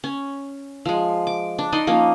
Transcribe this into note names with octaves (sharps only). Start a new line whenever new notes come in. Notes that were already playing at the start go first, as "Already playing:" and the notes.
C#4
F3 G#3
D6
D4
D#4 D5 D#5 C6
F3 A#3 C#4